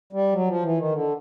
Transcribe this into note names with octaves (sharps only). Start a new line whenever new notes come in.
G3
F#3
F3
E3
D#3
D3